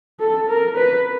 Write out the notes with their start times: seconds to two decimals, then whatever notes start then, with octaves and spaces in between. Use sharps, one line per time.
0.20 A4
0.49 A#4
0.76 B4